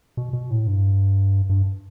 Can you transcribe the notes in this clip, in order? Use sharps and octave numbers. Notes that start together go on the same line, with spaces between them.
B2
B2
A2
G2
G2